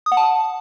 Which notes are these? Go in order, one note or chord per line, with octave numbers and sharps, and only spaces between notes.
D#6
F#5
A5